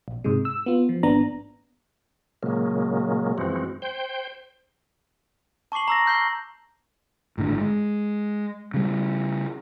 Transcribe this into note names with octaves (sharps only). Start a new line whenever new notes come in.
A#1
G#2 C3 G#3
E6
B3 F4
F3
G#1 B3 D4 A#5
A#2 C#3 F#3 G#3 A#3
F#2 E3 F3 G#3 C4 F#4
C5 G5
A5 C#6 D6 C7 F#7
A#5 E6 A#6
F6 G6 C7 G7
G#1 A2 D3
G#3
C#3 G3